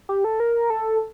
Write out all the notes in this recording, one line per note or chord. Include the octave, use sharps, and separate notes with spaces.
G4
A4
A#4
A4